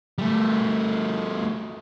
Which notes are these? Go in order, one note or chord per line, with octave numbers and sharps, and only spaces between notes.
G3 A3